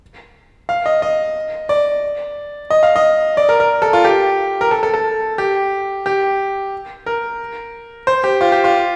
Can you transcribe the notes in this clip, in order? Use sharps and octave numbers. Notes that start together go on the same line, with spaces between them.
F5
D#5
D#5
D5
D#5
F5
D#5
D5
A#4
A#4
A4
F4
G4
A#4
A4
A4
A4
G4
G4
A#4
C5
G4
F4
G4
F4